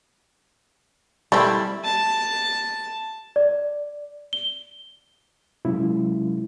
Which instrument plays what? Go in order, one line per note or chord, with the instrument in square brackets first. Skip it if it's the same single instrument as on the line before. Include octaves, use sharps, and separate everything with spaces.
[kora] G3 E4 [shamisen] A3 C4
[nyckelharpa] A5
[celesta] D5
G7
[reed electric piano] C3 F#3 G#3 C#4 E4 F4